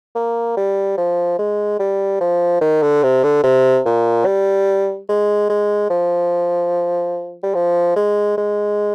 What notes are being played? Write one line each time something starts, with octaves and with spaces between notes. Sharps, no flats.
A#3
G3
F3
G#3
G3
F3
D#3
D3
C3
D3
C3
A#2
G3
G#3
G#3
F3
G3
F3
G#3
G#3